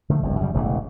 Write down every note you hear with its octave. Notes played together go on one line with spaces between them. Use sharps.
D3 D#3 F3 A3
F#1 C2 G2
F#2 C#3 G3
E1 A1 C#3 E3